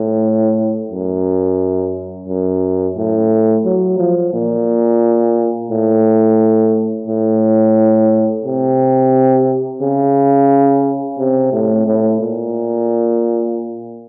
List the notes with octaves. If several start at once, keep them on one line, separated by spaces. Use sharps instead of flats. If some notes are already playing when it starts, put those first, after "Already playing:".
Already playing: A2
F#2
F#2
A2
F#3
F3
A#2
A2
A2
C3
C#3
C3
A2
A2
A#2